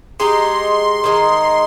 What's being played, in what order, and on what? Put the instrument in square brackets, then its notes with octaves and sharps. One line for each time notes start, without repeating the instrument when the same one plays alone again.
[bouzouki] G#3 D#4 G4 [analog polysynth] C6
[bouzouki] D#3 G#3 D#4